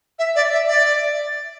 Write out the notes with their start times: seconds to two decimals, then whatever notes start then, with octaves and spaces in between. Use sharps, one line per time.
0.19 E5
0.36 D5
0.52 E5
0.68 D5